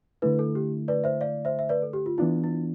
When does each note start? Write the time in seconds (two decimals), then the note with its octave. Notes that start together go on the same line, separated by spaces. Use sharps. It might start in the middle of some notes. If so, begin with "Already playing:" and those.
0.22 D3 A3 E4 B4
0.39 A4
0.55 G4
0.88 B4 D5
1.04 C5 E5
1.21 D5 F5
1.45 C5 E5
1.59 E5
1.69 B4 D5
1.82 A4
1.93 G4
2.06 F4
2.18 E3 B3 D4 E4 F4
2.44 E4